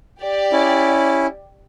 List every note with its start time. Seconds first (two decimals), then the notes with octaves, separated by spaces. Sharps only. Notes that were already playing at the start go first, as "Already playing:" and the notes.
0.22 G4 D5
0.52 C#4 E4